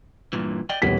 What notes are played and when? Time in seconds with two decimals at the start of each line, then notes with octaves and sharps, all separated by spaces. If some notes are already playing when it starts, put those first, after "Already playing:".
0.33 G2 A#2 E3
0.69 D5 D#5 G5
0.82 D#1 B2 E3 B3 B6